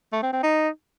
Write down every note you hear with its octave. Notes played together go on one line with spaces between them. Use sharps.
A3
C4
C4
D#4